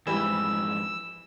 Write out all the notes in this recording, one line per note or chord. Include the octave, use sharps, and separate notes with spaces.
F2 G#2 E3 G3 E6